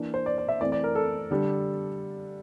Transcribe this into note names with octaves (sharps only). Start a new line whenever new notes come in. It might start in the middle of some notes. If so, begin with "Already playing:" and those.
Already playing: E3 A#3 D4
C5
D5
D5
E5
E3 A3 C4 D5
D5
A#4
A4
D3 G3 D4